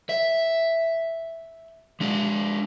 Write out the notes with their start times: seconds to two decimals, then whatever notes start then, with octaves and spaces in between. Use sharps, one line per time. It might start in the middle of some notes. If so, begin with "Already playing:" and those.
0.09 E5
2.00 G#3 D4